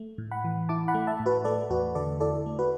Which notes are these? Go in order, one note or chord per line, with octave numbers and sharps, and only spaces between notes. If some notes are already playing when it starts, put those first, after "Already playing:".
Already playing: A3
A2
F#5 B5
E3
E4 A5 D6
F#5 B5
A3
E5 A5
A2
F#4 B4
A3 A4 D5
E2 F#4 B4
D3 A4 D5
E4 A4 D5
A3
F#4 B4